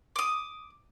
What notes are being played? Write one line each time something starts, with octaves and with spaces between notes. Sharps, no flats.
D6 D#6